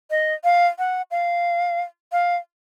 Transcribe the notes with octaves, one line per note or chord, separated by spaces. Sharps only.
D#5
F5
F#5
F5
F5